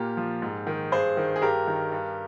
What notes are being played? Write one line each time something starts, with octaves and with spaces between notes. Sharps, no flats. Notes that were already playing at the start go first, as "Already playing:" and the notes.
Already playing: A#2 G4 A#4
F3
G#2
D#3
G2 G#4 C5
D#3
G#4
G2 G4 A#4
D#3
G2